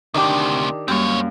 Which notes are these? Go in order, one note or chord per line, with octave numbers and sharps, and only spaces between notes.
D2 C3 D#3 D4 G4
F#2 G3 A#3 C4 C#5